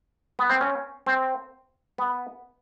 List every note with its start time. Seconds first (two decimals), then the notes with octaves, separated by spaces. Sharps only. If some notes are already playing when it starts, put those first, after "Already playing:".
0.39 B3
0.50 C4
0.61 C#4
1.06 C4
1.98 B3